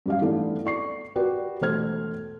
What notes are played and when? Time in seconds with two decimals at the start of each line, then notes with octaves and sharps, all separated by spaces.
0.06 F#2 G3 F5
0.20 G#2 E3 A3 B3 D4
0.65 D5 C#6 C7
1.16 F#4 G4 A#4 B4 D5 G5
1.61 E1 A3 C5 F6 G#6